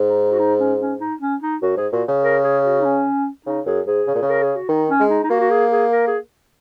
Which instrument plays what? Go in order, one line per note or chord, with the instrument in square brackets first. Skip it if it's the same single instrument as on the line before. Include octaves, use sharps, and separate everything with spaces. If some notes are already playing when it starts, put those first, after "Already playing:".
Already playing: [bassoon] G#2
[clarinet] D#4
F#4
D#4
C#4
C#4
D#4
C#4
D#4
[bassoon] F#2 [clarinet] F#4
[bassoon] G#2 [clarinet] G#4
[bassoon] A#2 [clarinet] F#4
[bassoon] C#3
[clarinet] A#4
G#4
F#4
D#4
C#4
[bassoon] C#3 [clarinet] D#4
[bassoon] F#2 [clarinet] G#4
[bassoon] G#2 [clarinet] G#4
[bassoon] C#3
A#2
C#3
[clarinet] A#4
G#4
F#4
[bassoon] D#3 [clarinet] D#4
[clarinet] C#4
[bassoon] G#3
[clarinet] D#4
D#4
[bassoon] A#3 [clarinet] F#4
[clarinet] F#4
G#4
G#4
A#4
G#4